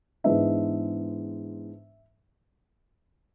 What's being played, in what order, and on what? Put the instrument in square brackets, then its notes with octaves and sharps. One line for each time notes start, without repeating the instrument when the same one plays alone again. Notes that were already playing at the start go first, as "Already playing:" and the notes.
[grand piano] G#2 E3 G#3 B3 D4 E5